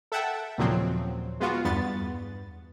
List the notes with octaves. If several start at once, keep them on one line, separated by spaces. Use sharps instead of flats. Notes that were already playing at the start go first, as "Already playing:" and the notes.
A4 E5 F#5 G5 A5
D#2 A#2 C#3 F3 F#3 C4
G#3 B3 F4 F#4
E2 G2 B3 A6